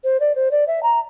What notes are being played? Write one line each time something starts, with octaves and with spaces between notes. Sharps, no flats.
C5
D5
C5
D5
E5
A#5